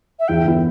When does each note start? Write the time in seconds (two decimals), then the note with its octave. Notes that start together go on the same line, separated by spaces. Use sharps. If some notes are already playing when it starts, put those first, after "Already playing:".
0.19 E5
0.28 E2 G5
0.46 D3 B3 E4